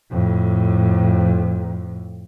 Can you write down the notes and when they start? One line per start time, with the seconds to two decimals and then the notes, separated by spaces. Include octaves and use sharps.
0.11 F2 A2